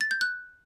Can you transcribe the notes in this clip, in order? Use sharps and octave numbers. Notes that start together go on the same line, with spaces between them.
A6
G6
F#6